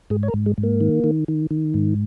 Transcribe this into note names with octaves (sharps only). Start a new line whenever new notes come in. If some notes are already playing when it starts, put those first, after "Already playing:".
G#2 G#4
C#5
A#4
G#2
G#3
G#2
A#3
D#3
D#3
D#3
D#3
G#2